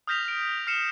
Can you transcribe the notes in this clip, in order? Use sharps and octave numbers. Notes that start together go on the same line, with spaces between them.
D#6 F6 G6 A#6 B6 F7
F6 D7
F6 C7 C#7 E7